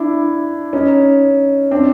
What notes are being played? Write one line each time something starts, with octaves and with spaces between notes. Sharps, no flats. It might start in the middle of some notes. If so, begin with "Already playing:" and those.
Already playing: D4 E4
C#4 D#4
C4 D4